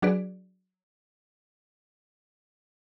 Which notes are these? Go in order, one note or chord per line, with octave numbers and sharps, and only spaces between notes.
F#3 D4 F#4 G#4 B4 D5